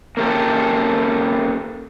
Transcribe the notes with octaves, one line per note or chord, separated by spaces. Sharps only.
A#3 C#4 G4 A4